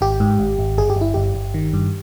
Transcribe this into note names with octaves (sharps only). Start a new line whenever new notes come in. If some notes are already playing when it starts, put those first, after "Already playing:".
G#1 G4
G#2
G#1
G#1
G1 G#4
G4
G1 E4
G1 G4
G1
D#3
G2